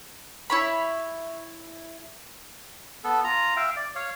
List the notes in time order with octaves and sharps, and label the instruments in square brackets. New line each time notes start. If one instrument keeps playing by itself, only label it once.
[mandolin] E4 C#5 B5
[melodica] B3 A4
F4 A#5
E5 F5 G5
D5
C#5 F5